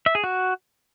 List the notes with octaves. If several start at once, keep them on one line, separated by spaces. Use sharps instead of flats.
E5
G#4
F#4